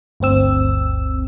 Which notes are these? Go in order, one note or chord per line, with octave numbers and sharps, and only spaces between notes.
G1 D2 C4 E6